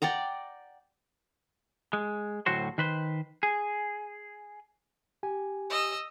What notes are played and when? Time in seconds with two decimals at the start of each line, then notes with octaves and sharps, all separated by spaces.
0.02 D5 F#5 G5 A#5
1.93 G#3
2.46 D2 A2 F#3 F#4 C5
2.78 D#3 B4 C5
3.43 G#4
5.23 G4 G#5
5.70 D#5 E6